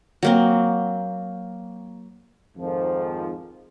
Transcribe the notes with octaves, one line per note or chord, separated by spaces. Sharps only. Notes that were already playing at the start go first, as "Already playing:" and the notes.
F#3 A#3 C4
F2 G#2 D#3 F3